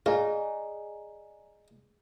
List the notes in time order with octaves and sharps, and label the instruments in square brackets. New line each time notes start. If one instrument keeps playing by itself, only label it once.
[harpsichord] F4 [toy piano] G#4 [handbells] D5 G#5 A#5 [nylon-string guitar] D#5